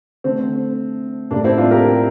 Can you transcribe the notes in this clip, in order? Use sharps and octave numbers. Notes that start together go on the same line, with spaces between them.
D3 A3 C4
A2 G3 A#3 D4
C4 E4
D4 F4
G4 A#4